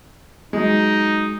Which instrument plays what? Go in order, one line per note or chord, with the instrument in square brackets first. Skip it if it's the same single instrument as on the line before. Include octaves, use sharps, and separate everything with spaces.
[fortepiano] F#3 G#3 [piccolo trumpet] D#4